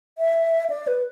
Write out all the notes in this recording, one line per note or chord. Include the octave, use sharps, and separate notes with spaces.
E5
D5
B4